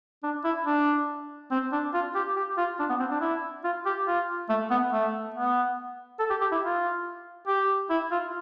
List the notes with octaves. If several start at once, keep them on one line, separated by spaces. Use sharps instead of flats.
D4
E4
D4
C4
D4
F4
G4
G4
F4
D4
B3
C4
D4
E4
F4
G4
F4
A3
B3
A3
B3
A4
G4
G4
E4
F4
G4
E4
F4